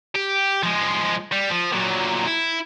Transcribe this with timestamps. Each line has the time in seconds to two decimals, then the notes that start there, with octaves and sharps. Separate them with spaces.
0.15 G4
0.63 F3 G#3
1.32 G3
1.50 F3
1.72 A#2 F#3
2.27 E4